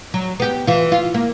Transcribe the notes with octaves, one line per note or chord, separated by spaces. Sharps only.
F#3
B3 G4
E3 F4
F4
A#3